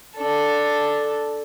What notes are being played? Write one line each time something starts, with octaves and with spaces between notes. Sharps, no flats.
D4 A4